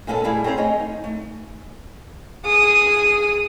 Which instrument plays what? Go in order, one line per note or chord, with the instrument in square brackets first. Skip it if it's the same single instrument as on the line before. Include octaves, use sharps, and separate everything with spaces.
[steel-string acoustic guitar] A#2 G#3 B3 C#4 F#4 A4
G3 A3 E4 G#4 F5
C4 C#4 G#4 C5 A#5
A3 C#5 D#5 G#5
D#4
A3
[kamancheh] G#4 D#6